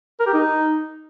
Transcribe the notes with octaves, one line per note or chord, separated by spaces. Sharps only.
A#4
G4
D#4